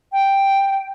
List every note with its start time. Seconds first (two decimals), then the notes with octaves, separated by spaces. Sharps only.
0.12 G5